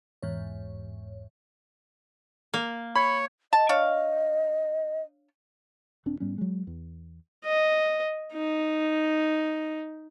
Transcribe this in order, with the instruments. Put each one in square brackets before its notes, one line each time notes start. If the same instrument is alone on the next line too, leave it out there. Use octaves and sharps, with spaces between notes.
[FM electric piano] G1 E2 G#2 C#5
[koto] A#3
[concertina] C#5 [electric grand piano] B5
[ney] D#5 [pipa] A5
[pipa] D4 C#5 F5
[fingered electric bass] D#1 C4 D4
G#2 G3 B3 C#4
F#3 G#3
E2
[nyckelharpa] D#5
D#4